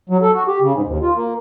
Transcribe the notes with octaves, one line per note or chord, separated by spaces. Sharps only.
F#3
A4
F#4
G4
C#3
G#2
D#2
F4
A#3